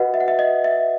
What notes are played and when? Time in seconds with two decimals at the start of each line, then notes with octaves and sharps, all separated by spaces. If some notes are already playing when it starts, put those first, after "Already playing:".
Already playing: F#4 B4 D#5 F#5
0.14 E5
0.20 F#5
0.28 E5
0.39 D#5
0.64 E5